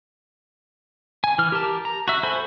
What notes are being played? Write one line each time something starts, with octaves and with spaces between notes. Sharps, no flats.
G#5
E3 F6
G4 A#4 A5
A#5
F#4 E5
F#4 A4 C5 G#5 B5